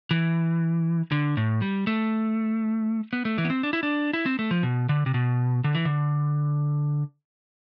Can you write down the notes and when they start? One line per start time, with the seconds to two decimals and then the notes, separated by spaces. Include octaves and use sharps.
0.11 E3
1.12 D3
1.37 A2
1.62 G3
1.87 A3
3.13 B3
3.25 A3
3.38 E3
3.45 B3
3.50 C4
3.63 D4
3.73 E4
3.83 D4
4.13 E4
4.26 C4
4.39 A3
4.51 F3
4.63 B2
4.89 D3
5.06 C3
5.14 B2
5.64 D3
5.75 E3
5.85 D3